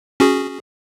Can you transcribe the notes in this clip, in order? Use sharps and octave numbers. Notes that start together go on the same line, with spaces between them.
C#4 F#4 G#4